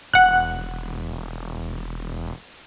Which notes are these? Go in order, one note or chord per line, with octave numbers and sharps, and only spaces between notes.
E1 F#5 F#6